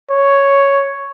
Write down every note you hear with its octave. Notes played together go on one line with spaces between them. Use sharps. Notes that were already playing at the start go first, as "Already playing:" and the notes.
C#5